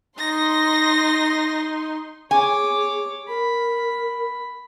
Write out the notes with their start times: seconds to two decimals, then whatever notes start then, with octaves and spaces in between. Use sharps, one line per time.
0.19 D#4 C6 A#6
2.31 G#4 C#5 G#5 D6
3.28 A#4 B5